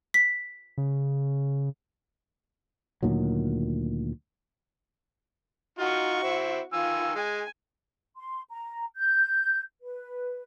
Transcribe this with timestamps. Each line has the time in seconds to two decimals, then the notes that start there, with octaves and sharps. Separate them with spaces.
0.14 B6
0.78 C#3
3.03 D2 A#2 D#3 F#3
5.79 D#4 F4 F#4 C#6
6.23 C4 E4
6.73 D#3 F4 G#5 E6
7.15 G#3 G#5
8.17 C6
8.50 A#5
8.97 G6
9.81 B4